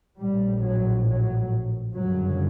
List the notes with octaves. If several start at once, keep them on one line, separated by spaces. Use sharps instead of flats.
A#1 A2 G3
F#3
F#3
G1 F#2 C#3 F#3